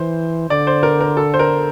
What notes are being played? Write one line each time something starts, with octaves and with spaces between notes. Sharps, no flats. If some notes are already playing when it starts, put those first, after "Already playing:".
Already playing: E3 C5
D3 D5
C5
A#4
A#4
A4
C5
A#4